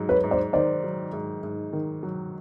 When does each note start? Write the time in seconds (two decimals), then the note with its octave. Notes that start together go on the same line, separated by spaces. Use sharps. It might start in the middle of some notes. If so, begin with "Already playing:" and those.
Already playing: G#2 F#3
0.09 B4 C#5
0.24 G#2
0.31 C5 D5
0.53 D#3 C5 D5
0.84 F#3
1.13 G#2
1.43 G#2
1.73 D#3
2.03 F#3